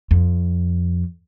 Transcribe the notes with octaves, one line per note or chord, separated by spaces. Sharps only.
F2